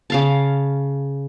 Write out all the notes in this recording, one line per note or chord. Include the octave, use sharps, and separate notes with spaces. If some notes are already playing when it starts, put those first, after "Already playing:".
C#3 F5 A5